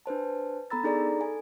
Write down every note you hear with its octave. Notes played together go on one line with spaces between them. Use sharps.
D4 B4 C5 A5
B3 A4 A#5 B5 E6 A6
D4 D#4 G#4 A4 D5 A#5
A4 G#5